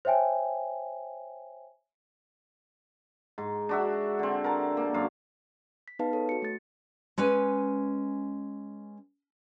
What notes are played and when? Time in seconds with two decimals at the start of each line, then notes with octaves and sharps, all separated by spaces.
0.05 C5 C#5 E5 G5 G#5
3.38 G#2
3.69 D4 F#4 E5
4.19 D3 C4
4.44 A#4 A5
4.77 A#3
4.94 F#2 F5
5.88 B6
5.99 B3 D#4 G#4 B4 F5 A5
6.13 A4 C#5
6.29 F#4 C#7
6.42 A3 A6
7.18 G#3 C#4 B4 G#5